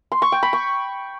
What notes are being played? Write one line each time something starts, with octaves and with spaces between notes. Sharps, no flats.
C6
C#6
G5
B5
C#6